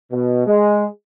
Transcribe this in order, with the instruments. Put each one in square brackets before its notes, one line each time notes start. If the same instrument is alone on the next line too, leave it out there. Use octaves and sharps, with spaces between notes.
[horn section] B2
G#3